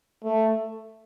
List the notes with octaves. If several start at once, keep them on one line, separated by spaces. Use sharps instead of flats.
A3